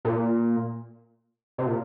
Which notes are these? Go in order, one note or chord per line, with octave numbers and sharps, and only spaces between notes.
A#2
C3
A#2